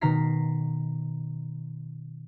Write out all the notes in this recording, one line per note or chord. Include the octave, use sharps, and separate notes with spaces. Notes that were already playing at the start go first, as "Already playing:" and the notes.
B2 D#3 A#5 B6 C7